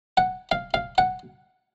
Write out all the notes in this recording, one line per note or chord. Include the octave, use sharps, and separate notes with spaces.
F#5
F5
F5
F#5